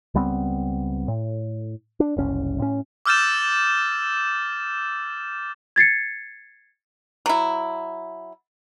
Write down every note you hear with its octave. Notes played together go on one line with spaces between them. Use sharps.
C#2 G3 B3 C4
A2
D4
F#1 C2 C#4
A2 C#4
D6 E6 F6 G6 A6 E7
G#6 A6 C7 C#7
F#3 E4